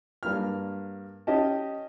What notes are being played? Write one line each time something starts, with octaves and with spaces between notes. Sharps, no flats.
G2 A#3 F6
C#4 G4 D#5 A5